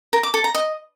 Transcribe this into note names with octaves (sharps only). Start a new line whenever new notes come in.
A#4
D6
A4
A#5
D#5